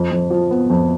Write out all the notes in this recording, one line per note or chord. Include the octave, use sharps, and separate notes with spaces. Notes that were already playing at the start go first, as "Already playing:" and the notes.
Already playing: F2
F2
F3
B3
F2